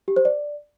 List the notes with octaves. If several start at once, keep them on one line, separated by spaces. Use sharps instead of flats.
G4
C5
D5